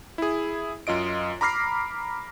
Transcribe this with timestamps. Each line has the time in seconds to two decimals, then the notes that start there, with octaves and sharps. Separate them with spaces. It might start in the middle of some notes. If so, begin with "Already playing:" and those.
0.18 E4 G#4
0.87 F#2 F4 D#5 D7
1.41 A#5 B5 D6 F6 A#6 C7